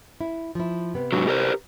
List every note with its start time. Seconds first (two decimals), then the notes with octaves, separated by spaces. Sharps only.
0.21 E4
0.55 F3 E4
0.94 C3 B3 C4
1.12 G#2 D3 F#3
1.27 G4 A#4 C5